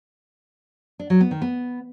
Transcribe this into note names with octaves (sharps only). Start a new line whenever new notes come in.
D4
F#3
B3
D#3
B3